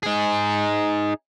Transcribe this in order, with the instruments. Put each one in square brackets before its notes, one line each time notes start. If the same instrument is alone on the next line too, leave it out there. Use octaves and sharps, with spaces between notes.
[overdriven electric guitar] D#4 G#4